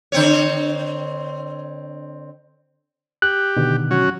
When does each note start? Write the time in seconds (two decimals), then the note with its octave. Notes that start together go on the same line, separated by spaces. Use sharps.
0.12 D3 C4 C#5
3.22 G4 F#6
3.57 B2 D3 D#3
3.91 F#3 C#4 F#4